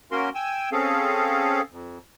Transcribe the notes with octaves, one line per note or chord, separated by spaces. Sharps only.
A#3 C#4 F#4 A#4 C6
G5 G#5 E6
C4 C#4 G#4 A4 F5
F2